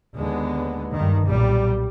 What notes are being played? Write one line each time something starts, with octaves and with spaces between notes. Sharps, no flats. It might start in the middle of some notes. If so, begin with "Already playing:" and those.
D#2 D3 G#3 B3
G2 D#3
B1 A#2 G3